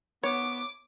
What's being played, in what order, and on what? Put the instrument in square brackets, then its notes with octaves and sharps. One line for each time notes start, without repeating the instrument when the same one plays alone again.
[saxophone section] B3 [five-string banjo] C#5 [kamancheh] D6